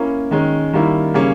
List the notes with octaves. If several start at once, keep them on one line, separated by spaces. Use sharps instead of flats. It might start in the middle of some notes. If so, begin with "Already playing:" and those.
Already playing: A#3 C#4 E4 A#4
D#3 G#3 C#4
D#3 G3 A#3 E4
C#3 G3 A#3 C#4